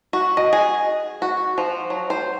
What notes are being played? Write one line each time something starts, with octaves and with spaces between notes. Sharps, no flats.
F#4
D#5
G#4
F#4
F3
F#3
C5